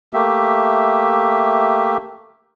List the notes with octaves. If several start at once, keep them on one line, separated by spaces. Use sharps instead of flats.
A3 A#3 G4 E5